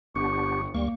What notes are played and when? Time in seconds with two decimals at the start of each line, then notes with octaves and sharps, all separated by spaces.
0.16 G1 B3 D4 G4 C#6
0.74 D2 G3 A#3 C#6